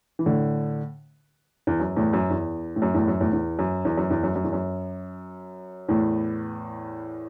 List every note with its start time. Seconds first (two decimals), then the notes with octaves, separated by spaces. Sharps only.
0.19 E3
0.26 A2 D3
1.67 E2
1.80 F#2
1.96 E2 A2
2.13 F#2
2.30 E2
2.76 A2
2.82 F#2
2.94 E2 A2
3.08 F#2
3.21 E2 A2
3.33 E2
3.59 F#2
3.85 E2
3.97 F#2
4.10 E2
4.23 F#2
4.35 F#2
4.44 E2
4.53 F#2
5.89 E2 A2